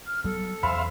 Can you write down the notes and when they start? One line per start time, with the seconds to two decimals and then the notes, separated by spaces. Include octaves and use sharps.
0.07 F6
0.24 F#3 G3 B3 A4
0.63 E2 C5 E5 F5 B5